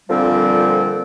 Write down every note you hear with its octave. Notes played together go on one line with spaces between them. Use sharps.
F2 A#2 D3 F3 G3 C4